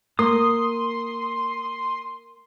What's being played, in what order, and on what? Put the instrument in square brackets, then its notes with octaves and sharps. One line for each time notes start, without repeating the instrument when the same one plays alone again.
[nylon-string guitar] A#3 [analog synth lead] C6 [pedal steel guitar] D#6